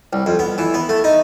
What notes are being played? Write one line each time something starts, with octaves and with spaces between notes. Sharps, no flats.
C2
F2
B3
E3
B3
A3
D#4